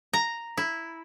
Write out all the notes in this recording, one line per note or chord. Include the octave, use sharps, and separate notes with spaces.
A#5
E4